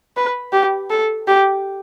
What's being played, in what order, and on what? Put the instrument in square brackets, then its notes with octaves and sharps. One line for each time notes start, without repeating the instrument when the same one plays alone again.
[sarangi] B4
G4
A4
G4